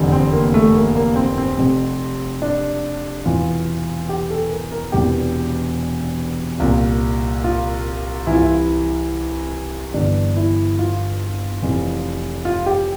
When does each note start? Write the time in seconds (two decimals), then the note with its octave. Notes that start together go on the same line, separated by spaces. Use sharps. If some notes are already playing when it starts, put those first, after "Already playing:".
Already playing: F1 E2 D3
0.12 C4
0.32 A#3
0.54 A3
0.75 A#3
0.96 A#3
1.16 C4
1.38 C4
1.58 F1 F2 C3
2.42 D4
3.26 E1 E2 C3 E3 F4
4.09 G4
4.30 A4
4.50 A#4
4.72 A#4
4.92 E1 E2 C3 E3 G4
6.59 C2 A#2 F4
7.44 F4
8.27 C2 C3 E3 E4
8.35 F4
8.42 E4
9.94 G1 G2 E3 D4
10.36 E4
10.79 F4
11.62 F1 F2 E3
12.45 F4
12.66 G4